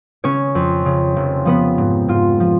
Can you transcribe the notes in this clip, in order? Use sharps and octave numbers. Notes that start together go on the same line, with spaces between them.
C#3 C#4 C#5
F2
C#3
F1
F3 B3 B4
G#2
G#2 F4
F3